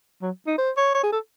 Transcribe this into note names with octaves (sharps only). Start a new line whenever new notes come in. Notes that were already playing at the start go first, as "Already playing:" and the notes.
F#3
D#4
C5
C#5
C#5
G#4
A4